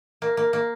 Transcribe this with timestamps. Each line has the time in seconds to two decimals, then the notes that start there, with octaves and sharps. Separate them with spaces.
0.22 A#3
0.37 A#3
0.53 A#3